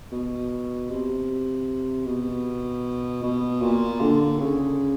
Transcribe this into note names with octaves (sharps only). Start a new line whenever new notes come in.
B2
C3
B2
B2
A#2
D3
C#3